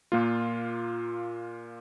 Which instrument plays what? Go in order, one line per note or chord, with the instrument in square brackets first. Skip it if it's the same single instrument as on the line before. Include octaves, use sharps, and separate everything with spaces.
[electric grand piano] A#2 A#3 F4